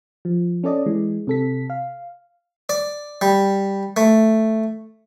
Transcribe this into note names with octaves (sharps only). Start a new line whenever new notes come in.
F3
C#4 A4 D5 D#5
E3 G#3
C3 A4 B6
F5
D5
G3
A3